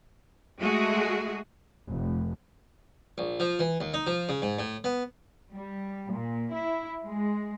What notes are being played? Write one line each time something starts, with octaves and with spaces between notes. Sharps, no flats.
G#3 A3 F#4 G#4
F1
A#1
F3
E3
D#2
D#4
F3
C#3
G#2
A2
B3
G3
A#2
E4
G#3